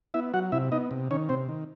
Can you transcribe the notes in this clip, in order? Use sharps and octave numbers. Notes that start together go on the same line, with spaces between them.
B3 E4 E5
F#3 F#4 F#5
C3 E4 E5
B3 D#4 D#5
C3
D#3 C#4 C#5
C3 C4 C5
D#3